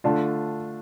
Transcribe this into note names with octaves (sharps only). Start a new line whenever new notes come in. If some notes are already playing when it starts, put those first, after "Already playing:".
D3 A3 D4 F4